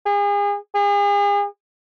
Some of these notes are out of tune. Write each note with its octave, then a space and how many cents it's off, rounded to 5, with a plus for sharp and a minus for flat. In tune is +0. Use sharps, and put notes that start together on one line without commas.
G#4 -35
G#4 -40